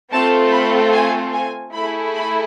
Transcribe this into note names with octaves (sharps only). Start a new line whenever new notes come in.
A3 C4 F4 A4 A5
B5
G#5
G#5
A3 E4 G#4 B5
B5